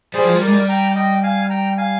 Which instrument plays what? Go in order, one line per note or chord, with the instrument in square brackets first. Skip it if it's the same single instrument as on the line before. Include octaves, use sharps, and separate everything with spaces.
[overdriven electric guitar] G3 [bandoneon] G#4 C5
[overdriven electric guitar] F3
G3
[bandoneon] A#4 D5
[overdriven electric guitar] G#3
G3
[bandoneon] G5 A#5
D#5 G5
F5 G#5
G5 A#5
F5 G#5